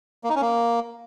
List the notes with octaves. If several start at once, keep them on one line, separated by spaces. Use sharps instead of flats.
A#3
D#4
C#4
A#3